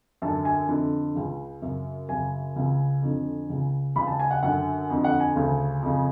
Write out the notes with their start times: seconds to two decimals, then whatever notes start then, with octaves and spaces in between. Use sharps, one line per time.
0.22 F#2 D3 A5
0.45 G#5
0.69 F2 D3
1.15 C#2 C#3
1.62 F#2 C#3
2.09 F#2 C#3 G#5
2.56 C#2 C#3
3.02 F2 D3
3.49 C#2 C#3
3.96 C#2 C#3 B5
4.07 A5
4.20 G#5
4.31 F#5
4.43 F#2 D3 F#5
4.90 F2 D3
5.04 F#5
5.20 G#5
5.36 D2 C#3
5.82 F2 C#3